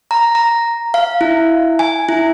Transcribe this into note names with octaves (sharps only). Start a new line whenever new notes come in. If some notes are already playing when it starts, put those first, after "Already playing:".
A#5
A#5
F5
E4
G#5
E4